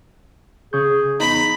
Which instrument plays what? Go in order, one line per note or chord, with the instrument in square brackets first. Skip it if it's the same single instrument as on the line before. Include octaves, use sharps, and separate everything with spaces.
[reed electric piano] C#3 C#6 G6 [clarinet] G#4
[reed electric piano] E2 B3 D#4 [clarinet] A#5 [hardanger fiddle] B5